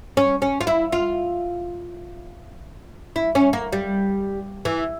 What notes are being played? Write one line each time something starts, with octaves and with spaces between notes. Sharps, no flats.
C#4
C#4
F4
E4
F4
E4
C#4
A#3
G3
E3